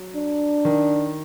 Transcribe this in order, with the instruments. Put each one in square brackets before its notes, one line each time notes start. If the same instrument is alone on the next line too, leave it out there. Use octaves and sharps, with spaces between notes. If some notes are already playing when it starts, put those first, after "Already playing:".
Already playing: [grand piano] F#3
[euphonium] D4
[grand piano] D#3